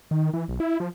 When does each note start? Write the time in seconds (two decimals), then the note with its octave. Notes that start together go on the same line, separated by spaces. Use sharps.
0.11 D#3
0.33 E3
0.48 B1
0.60 E4
0.80 F3